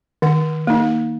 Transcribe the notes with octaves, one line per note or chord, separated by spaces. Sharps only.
D#3 F#5
A#3 D#4